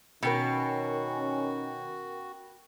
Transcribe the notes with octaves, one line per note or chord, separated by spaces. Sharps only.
B2 D#3 C#4 F#4 A#4 G5 B5